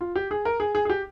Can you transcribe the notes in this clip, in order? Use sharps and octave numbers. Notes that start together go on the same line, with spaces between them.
F4
G4
G#4
A#4
G#4
G#4
G#4
G4